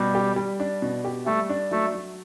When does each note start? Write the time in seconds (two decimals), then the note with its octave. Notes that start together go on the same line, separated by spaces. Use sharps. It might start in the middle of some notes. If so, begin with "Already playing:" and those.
Already playing: B2 G3
0.15 G4
0.36 G3
0.60 D4
0.82 B2
1.05 G4
1.26 G3 A3
1.49 D4
1.71 F#3 A3
1.94 F#3